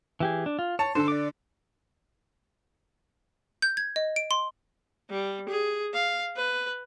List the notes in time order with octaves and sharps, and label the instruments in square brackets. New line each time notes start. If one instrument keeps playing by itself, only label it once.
[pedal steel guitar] E3 G4 G#4
D4
F4
[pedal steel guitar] C#5 [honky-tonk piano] A5
[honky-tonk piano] D3 [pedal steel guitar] A4 C5
[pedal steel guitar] D5 D6
[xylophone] G6
G#6
D#5
D7
C6
[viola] G3
G#4
F5
B4